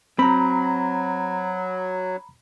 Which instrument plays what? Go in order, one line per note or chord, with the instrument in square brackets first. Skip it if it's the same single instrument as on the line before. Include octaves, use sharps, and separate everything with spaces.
[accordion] F#3 [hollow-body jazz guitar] C4 [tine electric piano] A#5 B5